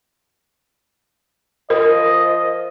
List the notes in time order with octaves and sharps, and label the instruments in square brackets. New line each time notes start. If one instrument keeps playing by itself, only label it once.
[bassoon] F3 [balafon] A#4 [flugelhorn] D#5